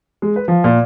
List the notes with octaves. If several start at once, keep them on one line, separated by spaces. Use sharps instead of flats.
G#3
B4
F3
A#2